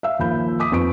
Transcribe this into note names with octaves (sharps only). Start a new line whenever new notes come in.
E5 F5 E6
D#2 F3 B5 G6
D6 D#6 B6
F2 B4 C#6 D7